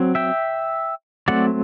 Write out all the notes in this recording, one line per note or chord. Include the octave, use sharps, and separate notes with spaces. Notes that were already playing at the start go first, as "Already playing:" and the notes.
Already playing: F#3 C4
E5 G5
F#3 A3 C4 D5 F#5